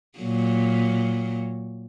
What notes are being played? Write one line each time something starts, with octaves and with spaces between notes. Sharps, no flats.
A#2 F#3